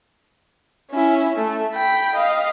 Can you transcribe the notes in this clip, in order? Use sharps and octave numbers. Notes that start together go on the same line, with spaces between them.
C#4 E4
A3
G5 B5
D#5 F5